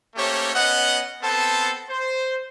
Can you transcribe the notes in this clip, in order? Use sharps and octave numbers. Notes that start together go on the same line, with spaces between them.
A3 A#3 C#4 G4 C5 C#5
B3 C#4 D#5 F#5
B3 C4 A4 C5 A5
C5